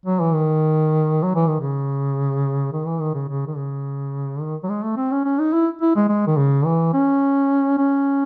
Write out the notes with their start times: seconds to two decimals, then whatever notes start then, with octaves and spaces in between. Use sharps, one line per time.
0.06 F#3
0.20 E3
0.34 D#3
1.23 F#3
1.36 E3
1.48 D#3
1.60 C#3
2.73 D#3
2.86 E3
3.01 D#3
3.14 C#3
3.29 C#3
3.47 D#3
3.57 C#3
4.41 D#3
4.63 F#3
4.69 G#3
4.83 A3
4.97 C4
5.11 C#4
5.25 C#4
5.39 D#4
5.53 E4
5.81 E4
5.96 G#3
6.09 G#3
6.27 D#3
6.37 C#3
6.66 E3
6.94 C#4
7.78 C#4